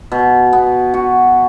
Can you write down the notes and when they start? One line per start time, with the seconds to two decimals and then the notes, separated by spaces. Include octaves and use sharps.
0.12 B2
0.53 B3
0.94 F#4